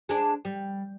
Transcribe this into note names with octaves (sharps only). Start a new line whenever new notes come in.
G#3 D4
G3